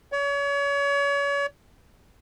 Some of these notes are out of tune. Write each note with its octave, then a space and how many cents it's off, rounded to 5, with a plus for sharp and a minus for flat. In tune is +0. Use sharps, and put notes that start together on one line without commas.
C#5 +35